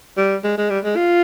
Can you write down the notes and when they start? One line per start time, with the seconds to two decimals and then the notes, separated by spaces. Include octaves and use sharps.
0.17 G3
0.44 G#3
0.58 G#3
0.70 G3
0.84 G#3
0.96 F4